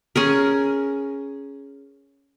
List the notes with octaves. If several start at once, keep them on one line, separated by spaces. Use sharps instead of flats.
C#4 G#4 A#4